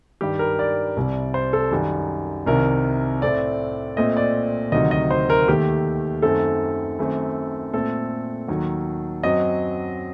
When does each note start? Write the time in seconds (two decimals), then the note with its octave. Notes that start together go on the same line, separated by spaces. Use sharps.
0.21 G2 D#3 G3 G4
0.39 A#4
0.59 D5
0.97 C2 C3 G3
1.34 C5
1.53 A4
1.71 F#2 D#3 G3
2.47 C2 C3 D#3 A#4
3.22 A2 A3 C4 D5
3.97 A#2 A3 C4 D#5
4.17 D5
4.72 D2 C3 D#3 F#3 D#5
4.91 D#5
5.11 C5
5.30 A#4
5.47 D#2 D#3 A3 G4
6.22 F#2 D#3 A3 C4 A4
6.99 F#2 D#3 A3 C4
7.73 A#2 A3 C4 A4
8.48 D#2 D#3 F#3
9.23 F#2 F#3 C4 D#5